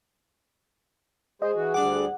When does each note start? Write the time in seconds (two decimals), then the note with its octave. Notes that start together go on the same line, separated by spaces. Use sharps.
1.42 G#3 G#4 C5 D#5
1.55 E3 F#4
1.74 D2 G3 D4 F#5 D6